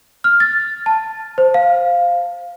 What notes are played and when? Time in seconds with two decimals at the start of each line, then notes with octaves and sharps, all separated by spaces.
0.24 F6
0.40 A6
0.86 A5
1.38 C5
1.54 F5